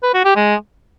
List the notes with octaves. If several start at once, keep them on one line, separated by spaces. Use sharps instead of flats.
B4
F#4
G4
G#3